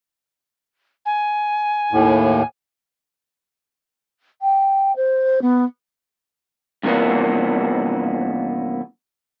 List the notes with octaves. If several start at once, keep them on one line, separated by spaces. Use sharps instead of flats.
G#5
D#2 A2
G5
C5
B3
G2 C3 E3 F3 A#3 B3